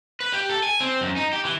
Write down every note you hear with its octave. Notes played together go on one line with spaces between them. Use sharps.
B4
G4
A4
G#5
C4
F#2
D#4
G4
E3